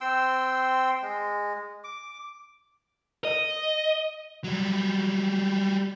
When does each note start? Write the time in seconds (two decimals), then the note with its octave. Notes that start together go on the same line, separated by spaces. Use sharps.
0.01 C4 G5 C6 E6
1.02 G#3
1.84 D6
3.25 D#5
4.44 F#3 G3